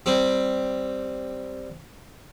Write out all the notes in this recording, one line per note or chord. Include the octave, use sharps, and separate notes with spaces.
G3 C4